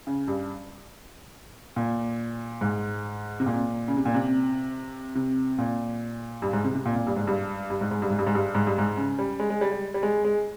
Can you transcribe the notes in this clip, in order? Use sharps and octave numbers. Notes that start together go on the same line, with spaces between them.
C#3
G2
A#2
G#2
C3
A#2
C#3
C3
A#2
C3
C3
A#2
G2
G#2
C3
C3
A#2
A#2
G2
G#2
G2
G2
G#2
G#2
G2
G#2
G2
G#2
G2
G#2
G2
G#2
C#3
G3
G#3
G#3
G3
G3
G3
G#3
G#3